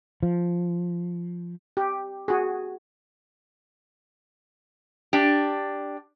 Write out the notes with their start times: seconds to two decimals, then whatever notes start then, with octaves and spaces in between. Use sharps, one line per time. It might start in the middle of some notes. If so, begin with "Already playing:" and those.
0.23 F3
1.77 G4
2.28 F#4 G#4
5.13 D4 G4